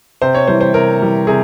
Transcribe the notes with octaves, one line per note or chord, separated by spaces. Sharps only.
C3 C5
C#5
E3 G3 C5
C5
C3 A#4
E3 G3
C3 G#4